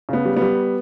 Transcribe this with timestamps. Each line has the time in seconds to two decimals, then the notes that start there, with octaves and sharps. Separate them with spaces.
0.09 C#3 B3
0.25 G3
0.36 B3
0.42 G3